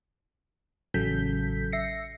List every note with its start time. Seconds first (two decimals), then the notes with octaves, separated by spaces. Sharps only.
0.94 A1 C#3 F#3 A4 G6 B6
1.72 E5 A#6 C7 C#7